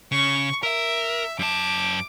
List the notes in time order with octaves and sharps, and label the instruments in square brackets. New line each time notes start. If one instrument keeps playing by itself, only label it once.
[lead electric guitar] C#3 [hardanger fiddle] C#6
[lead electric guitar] A#4 [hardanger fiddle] E5
[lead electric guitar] F#2 A5 [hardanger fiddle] D6